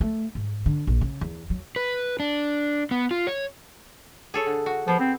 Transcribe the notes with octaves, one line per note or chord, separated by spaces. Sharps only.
A3
G#2
D3
A#1
C#3
E2
F#3
B4
D4
B3
F4
C#5
G#4 A4 C#5
D3
F#4
F3 B3
C4